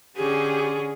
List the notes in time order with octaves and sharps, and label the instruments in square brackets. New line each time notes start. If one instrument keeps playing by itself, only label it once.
[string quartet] D3 C#4 G#4 [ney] G4